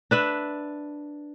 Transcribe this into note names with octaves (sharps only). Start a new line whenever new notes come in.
D4 B4 E5